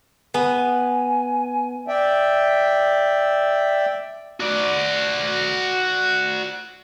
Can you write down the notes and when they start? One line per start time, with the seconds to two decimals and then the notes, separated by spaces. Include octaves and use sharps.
0.34 B3 G#5
1.88 D5 E5 G5
4.40 F#4 D5